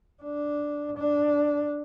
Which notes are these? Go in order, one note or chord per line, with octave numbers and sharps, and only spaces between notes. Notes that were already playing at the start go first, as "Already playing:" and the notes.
D4
D4